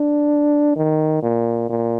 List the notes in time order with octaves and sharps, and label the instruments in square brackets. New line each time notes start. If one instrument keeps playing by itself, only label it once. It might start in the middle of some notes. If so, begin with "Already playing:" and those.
Already playing: [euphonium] D4
D#3
A#2
A#2